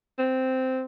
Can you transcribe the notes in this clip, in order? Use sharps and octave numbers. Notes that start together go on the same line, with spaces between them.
C4